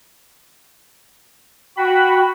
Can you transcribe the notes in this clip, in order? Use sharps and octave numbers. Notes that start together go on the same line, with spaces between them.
F#4 G5 B5